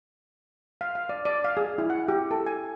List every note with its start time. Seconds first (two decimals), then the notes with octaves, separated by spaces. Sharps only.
0.81 F5
0.95 F5
1.09 D5
1.25 D5
1.44 F5
1.57 G#4
1.78 E4
1.90 F#5
2.08 G4
2.31 A4
2.46 G#5